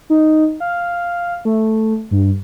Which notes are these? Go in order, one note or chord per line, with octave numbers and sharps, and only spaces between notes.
D#4
F5
A3
G2